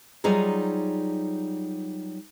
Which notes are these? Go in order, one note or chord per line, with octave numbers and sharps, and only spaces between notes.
F#3 G3 D#4 F4 G#4